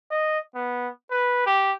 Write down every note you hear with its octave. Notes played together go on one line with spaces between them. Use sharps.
D#5
B3
B4
G4